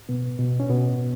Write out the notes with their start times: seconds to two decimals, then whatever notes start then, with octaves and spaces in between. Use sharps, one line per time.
0.09 B2 B3
0.39 B2
0.60 C#4
0.70 B2 B3